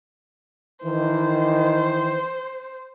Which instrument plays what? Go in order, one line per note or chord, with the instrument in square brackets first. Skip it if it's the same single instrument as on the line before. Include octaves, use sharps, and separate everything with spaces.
[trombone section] D#3 E3 [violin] C5